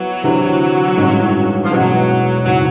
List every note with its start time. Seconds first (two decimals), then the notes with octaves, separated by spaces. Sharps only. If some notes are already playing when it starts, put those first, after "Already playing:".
Already playing: F#3 B3 E4
0.22 D2 C3 E3
0.97 A1 G2 D#3 G#3 C#4
1.64 F3
1.70 E1 E2 B2 F#3 G#3 C#4
2.45 F#1 D#3 F#3